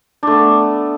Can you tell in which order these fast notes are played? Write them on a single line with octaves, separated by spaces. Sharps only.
D4 A3 B3